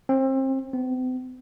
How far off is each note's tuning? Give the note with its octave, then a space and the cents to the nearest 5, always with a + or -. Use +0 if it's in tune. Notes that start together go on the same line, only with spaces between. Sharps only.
C4 +30
C4 -45